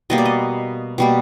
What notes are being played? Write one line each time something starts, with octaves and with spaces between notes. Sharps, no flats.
B2 G3 A#3 D#5
D5
D#5
B2 G3 A#3